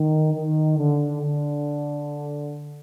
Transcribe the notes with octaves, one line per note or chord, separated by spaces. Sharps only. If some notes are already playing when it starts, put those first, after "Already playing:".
Already playing: D#3
D#3
D3
D3